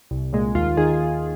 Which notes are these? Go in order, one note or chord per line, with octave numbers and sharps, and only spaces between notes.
C2
A#2 G#3
D#2 F4
D#3 G#4